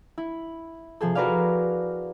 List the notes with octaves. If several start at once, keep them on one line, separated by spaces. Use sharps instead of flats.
E4
C3 F3 G#4 A4
F#4 A#4 B4 D5 F5